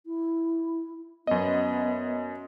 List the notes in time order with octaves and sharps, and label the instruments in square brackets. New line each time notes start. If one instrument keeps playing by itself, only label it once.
[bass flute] E4
[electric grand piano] F#2 D#5 [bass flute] B3